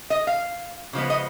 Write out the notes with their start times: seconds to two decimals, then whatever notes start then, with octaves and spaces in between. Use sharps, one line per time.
0.10 D#5
0.27 F5
0.93 C#3 F3 G#3 B3
1.10 D#5